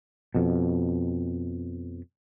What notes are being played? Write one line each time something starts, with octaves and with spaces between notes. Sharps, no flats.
F2 B2